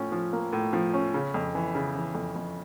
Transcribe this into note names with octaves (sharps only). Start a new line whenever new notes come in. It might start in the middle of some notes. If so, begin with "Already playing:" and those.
Already playing: A2 F3 C#4
F3
A#3
A2
F3
C#4
C#3
F2
E3
C#3
E3
F2
F2